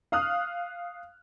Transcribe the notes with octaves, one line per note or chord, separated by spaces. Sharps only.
F5 D#6 F6 F#6